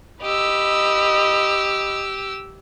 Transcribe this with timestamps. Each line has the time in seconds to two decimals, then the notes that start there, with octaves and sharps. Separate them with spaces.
0.22 G4 D#5 B5 E6